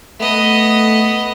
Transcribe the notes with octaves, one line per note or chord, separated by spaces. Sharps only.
A3 B3 D#5